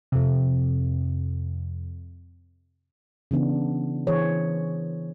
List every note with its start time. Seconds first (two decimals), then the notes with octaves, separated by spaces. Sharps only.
0.12 F2 C3
3.31 C#3 E3 B3 D4
4.07 E3 G#4 C5 C#5